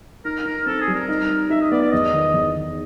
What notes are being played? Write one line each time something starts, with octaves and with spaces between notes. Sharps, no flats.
D#4 A#4
D#4 A#4
C4 A4
G#4
G3
A#4
D#4
D#4
D#4 E5
D#5
B3 D5
D5
E2 D#5
D#3
E2
D#3